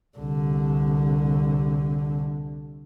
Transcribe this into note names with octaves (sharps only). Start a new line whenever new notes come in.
C2 D3